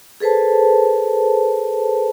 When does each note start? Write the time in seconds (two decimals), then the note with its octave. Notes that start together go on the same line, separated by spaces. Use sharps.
0.20 G#4 A4 B4 C5 A5